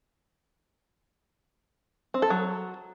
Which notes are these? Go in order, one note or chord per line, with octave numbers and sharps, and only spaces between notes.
C4
A4
F#3